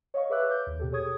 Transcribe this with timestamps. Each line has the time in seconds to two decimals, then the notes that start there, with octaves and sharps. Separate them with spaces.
0.14 C#5 D#5 F5 C#6
0.30 G#4 B4 E5 D6 E6 F#6
0.49 D6 G6
0.67 D#2
0.79 B2 G4 A4
0.92 G#4 A4 C#5 C#6 D#6 G#6